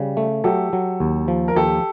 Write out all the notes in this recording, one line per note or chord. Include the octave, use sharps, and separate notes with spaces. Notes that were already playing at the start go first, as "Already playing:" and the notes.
Already playing: C#3 G3
A3
F#3 G4 A4
F#3
D#2
F3
A#4
D#2 G4 A4